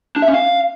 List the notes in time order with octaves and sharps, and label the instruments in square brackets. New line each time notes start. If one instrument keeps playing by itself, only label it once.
[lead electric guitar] D4
E5
C#4
F5